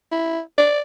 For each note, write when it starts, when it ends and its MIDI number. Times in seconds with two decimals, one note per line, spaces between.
0.11 0.40 64
0.58 0.81 74